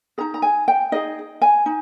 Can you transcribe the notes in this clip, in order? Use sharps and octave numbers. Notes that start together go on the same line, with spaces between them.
D#4 G#4 A#5
A#5
G#5
G5
D#4 G#4 D#5
G#5
D#4